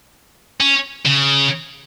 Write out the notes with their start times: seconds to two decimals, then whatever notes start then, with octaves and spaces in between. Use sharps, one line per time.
0.60 C#4
1.05 C#3